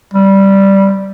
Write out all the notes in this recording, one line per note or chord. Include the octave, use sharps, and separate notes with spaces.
G3